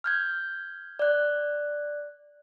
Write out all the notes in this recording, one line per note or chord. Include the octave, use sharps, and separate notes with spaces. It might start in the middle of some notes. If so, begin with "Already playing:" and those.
F6 G6 G#6
D5 F#6